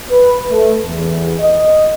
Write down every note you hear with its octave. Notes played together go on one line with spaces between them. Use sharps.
B4
A3
E2
D#5